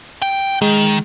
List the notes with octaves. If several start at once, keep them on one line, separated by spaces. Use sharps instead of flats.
G5
D#3 G#3